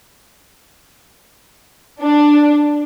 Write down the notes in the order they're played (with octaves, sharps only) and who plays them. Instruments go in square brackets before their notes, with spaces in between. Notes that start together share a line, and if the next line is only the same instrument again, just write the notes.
[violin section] D4